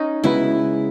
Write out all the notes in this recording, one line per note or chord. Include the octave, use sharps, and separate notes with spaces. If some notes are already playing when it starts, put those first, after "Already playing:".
Already playing: C#4 D#4
C#3 G#3 B3 E4 F#4 B4